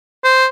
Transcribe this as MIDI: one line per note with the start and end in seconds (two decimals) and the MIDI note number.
0.24 0.46 72